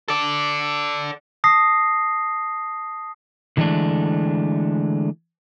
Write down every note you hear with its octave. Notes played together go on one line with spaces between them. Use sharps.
A4 D5
A5 D#6 A#6 C7
D3 E3 G#3 A3 D4